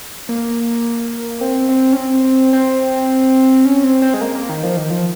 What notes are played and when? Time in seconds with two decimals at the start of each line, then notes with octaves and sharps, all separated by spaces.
0.29 A#3
1.41 C4
1.69 C4
1.93 C#4
1.97 C4
2.53 C4
3.65 C#4
3.84 C4
4.02 C4
4.14 G#3
4.21 A#3
4.35 A#3
4.49 D#3
4.63 F3
4.77 D#3
4.91 F3